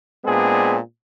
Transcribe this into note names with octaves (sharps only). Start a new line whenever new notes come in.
A#2 G#3 B3 C4 D4 G#4